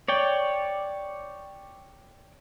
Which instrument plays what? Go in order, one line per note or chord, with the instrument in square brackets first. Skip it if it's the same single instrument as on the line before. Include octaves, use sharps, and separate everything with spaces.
[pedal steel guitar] C#5 D5 G5